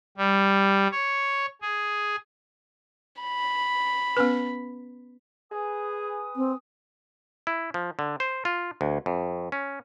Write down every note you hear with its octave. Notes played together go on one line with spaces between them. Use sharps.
G3
C#5
G#4
B5
B3 C#4 B4
G#4 B4 G#5 D#6
C4
E4
F3
D3
C5
F4
D2
F2
C#4